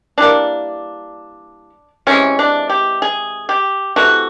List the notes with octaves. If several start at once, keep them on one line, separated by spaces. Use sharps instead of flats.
E3 G3 A#3 D4
C3 E3 G#3 C#4
D4
G4
G#4
G4
C3 E3 A3 F#4